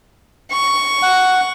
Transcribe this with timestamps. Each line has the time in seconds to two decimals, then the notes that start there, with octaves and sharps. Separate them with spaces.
0.51 C#6
1.03 F#5